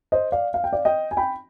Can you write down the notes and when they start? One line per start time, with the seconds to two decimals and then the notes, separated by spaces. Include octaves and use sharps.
0.12 C5 D#5
0.32 D5 F5
0.54 F5
0.64 G5
0.73 D5 F5
0.85 D#5 G5
1.11 G#5
1.17 G5 B5